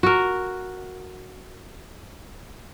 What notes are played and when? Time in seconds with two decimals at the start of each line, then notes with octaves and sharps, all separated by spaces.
0.03 F#4 A#4